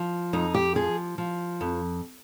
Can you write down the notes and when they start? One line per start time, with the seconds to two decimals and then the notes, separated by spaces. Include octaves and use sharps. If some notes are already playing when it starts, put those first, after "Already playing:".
Already playing: F3
0.33 F2 D#4
0.54 G4
0.75 F3 G#4
1.18 F3
1.61 F2